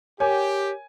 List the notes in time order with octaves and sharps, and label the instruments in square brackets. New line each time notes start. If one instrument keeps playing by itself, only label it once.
[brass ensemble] G4 [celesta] A#4 C#5 [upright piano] G#5